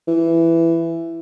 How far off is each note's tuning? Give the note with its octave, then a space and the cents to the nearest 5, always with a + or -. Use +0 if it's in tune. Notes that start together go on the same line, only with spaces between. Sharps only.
E3 +10